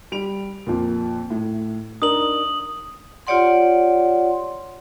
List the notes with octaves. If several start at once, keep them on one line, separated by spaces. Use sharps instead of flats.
G3 D7 F7
F2 A#2
A2
D4 D#4 A#4 D#6 F#7
F4 G4 C#5 D5 F#5 C6